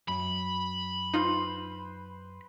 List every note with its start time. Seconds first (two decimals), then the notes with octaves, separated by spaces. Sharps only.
0.08 F#2 B5
1.14 D#4 F4 B4 C5